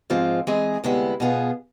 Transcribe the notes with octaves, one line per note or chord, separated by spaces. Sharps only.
G#2 F3 G#3 C4 F4
E3 G#3 C4 G#4
D2 C3 G#3 B3 E4
B2 B3 F4 G#4